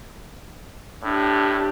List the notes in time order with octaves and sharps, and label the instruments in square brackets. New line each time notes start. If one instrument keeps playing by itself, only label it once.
[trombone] A2 [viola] D4 G4